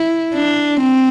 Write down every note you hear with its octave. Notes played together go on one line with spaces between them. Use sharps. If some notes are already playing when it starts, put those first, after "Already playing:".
Already playing: E4
D4
C4